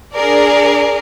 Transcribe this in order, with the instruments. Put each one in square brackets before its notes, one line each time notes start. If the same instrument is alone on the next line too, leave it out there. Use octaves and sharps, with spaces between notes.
[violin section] D4 G#4 A#4 D5